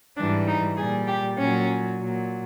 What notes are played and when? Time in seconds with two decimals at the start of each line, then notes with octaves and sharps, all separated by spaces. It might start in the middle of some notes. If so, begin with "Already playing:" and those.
0.17 G#2 E3 G3 D4
0.47 D#4
0.77 A#2 G3 G#4
1.07 G4
1.37 A#2 F#3 C#4
1.98 A#2 F#3